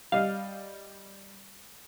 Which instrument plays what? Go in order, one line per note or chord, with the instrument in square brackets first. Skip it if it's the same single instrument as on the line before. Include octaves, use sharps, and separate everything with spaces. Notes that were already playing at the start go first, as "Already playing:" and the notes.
[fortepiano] G3 D#5 [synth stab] F5